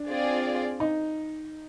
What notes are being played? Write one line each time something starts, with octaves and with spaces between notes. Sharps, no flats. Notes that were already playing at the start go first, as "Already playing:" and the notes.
Already playing: D4
C4 F4 G#4 D5
D#4